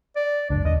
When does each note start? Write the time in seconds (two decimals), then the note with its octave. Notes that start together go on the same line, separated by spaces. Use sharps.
0.16 D5
0.50 F#1 C#2 D4
0.65 E1 D#2 D#5